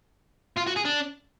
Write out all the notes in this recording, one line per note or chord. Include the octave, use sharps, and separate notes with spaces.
F4
F#4
G#4
D4